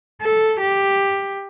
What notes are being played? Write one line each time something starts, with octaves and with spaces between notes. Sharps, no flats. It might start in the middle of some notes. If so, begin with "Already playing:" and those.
A4
G4